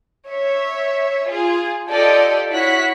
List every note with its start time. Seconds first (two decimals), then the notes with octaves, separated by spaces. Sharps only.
0.27 C#5 E5
1.30 F4 G#4
1.90 F4 G4 A4 D5 D#5
2.49 E4 F#4 C#5 F#6 B6